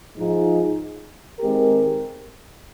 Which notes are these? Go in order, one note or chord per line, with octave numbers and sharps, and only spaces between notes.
G#2 F3 G#3 D#4
D#3 G#3 C4 G4 A#4